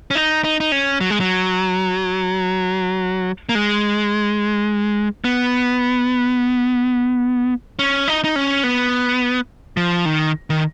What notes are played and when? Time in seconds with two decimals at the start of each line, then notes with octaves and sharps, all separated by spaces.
0.11 C#4
0.15 D#4
0.44 D#4
0.60 D#4
0.72 C#4
1.01 F#3
1.10 G#3
1.20 F#3
3.49 A#3
3.55 G#3
5.24 B3
7.79 C#4
8.08 D#4
8.24 D#4
8.36 C#4
8.63 B3
9.77 F3
10.06 D#3
10.50 D#3